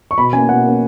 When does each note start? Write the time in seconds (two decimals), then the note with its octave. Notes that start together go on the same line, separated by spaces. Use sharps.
0.11 C#6
0.18 B2 B5
0.33 A#3 C#4 G#5
0.49 B2 F#5
0.65 A#3 C#4